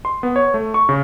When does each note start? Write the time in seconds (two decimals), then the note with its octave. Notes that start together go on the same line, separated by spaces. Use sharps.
0.05 C6
0.23 B3
0.36 C#5
0.54 A3
0.74 C#6
0.89 C#3